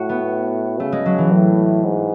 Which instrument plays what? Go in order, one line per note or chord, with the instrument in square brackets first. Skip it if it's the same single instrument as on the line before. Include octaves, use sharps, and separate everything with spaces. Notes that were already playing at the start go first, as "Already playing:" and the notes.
Already playing: [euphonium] A2 [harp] F#4
[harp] B3
[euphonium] C#3 [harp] A3
[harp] G#3
F#3
E3
[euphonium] A2
G#2